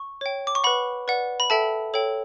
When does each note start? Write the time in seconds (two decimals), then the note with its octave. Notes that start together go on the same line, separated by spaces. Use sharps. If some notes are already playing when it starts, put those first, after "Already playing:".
Already playing: C#6
0.21 C#5 G5
0.47 D6
0.55 C#6
0.64 B4 F#5 B5
1.08 B4 D5 F#5
1.40 B5
1.50 A4 E5 G5 A5
1.94 A4 C#5 G5